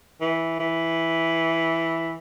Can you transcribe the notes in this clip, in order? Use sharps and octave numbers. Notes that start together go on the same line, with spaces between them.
E3
E3